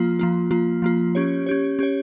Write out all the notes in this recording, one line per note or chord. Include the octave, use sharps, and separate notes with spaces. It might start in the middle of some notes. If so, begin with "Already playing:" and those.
Already playing: F3 A#3 F4
F3 A#3 F4
F3 A#3 F4
F3 A#3 F4
C#4 G4 C#5
C#4 G4 C#5
C#4 G4 C#5